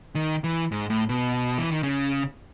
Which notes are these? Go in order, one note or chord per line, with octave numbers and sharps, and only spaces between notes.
D#3
E3
G#2
A2
B2
E3
D#3
C#3